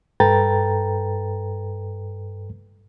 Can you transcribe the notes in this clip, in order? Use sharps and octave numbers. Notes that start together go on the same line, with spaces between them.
G2 A4 B4 G5 A#5 A6